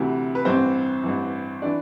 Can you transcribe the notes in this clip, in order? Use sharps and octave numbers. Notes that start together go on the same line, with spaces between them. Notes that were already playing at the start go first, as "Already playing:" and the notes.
Already playing: D2 C3 E3
B4
A1 G2 E3 C4 C5
A1 G2 E3
E3 D4 D5